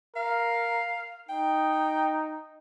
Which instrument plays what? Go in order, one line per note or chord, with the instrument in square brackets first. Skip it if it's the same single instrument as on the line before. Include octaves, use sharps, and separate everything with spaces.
[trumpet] A#4 [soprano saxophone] F5
[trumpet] D#4 [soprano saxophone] G5